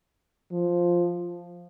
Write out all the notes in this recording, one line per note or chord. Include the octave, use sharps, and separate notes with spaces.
F3